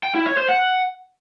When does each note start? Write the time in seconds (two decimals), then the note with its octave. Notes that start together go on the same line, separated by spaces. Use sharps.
0.03 G5
0.15 E4
0.26 C#5
0.37 C5
0.49 F#5